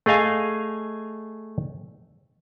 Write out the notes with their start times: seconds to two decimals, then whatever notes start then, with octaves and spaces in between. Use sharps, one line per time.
0.06 A3 G#4 D#5 F5 G#5